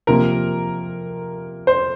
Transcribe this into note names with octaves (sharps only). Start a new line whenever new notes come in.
C3 F3 A#3 A#4
C5